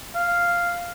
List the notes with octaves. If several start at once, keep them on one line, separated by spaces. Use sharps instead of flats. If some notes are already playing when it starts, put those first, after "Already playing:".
F5